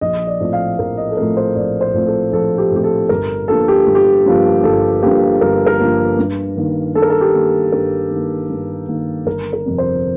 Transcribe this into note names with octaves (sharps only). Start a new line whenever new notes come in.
A#1 D#5
D5
A2 F3 A3 C4
F5
A#1 A#4
D#5
A4
A2 F3 A3 C4 A#4
C5
A#1 D5
C5
A2 F3 A3 C4
A4
A#1 A4
G4
A2 F3 A3 C4 G4
A4
G1 A#4
G2 F3 A#3 A4
G4
G1
G4
G2 F3 A#3
G1 A4
G2 F3 A#3 G4
G1 A#4
A#4
G2 F3 A#3
G2
D#3 A#3
G2 A4
A#4
A4
G4
D#3 A#3
G2 A#4
D#3
A#3
G2
D#3 A#3
G1 A#4
A#4
F2 C3
C5